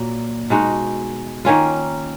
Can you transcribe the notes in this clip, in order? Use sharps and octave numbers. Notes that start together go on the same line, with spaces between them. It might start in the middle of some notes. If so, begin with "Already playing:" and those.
Already playing: A#2 F#3 A#3
B2 G#3 D#4 F#4
D#3 A#3 C#4 F4